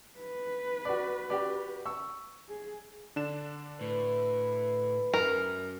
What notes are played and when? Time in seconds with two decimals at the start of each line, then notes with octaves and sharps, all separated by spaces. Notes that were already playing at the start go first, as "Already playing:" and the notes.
0.19 B4
0.85 F#4 D5
1.30 F#4 G4 D5
1.85 C#6 E6
2.49 G#4
3.16 D3 D4 E7
3.81 A2 B4
5.14 F#2 A#4